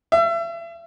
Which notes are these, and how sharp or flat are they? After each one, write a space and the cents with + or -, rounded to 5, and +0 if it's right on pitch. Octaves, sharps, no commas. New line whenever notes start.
E5 +35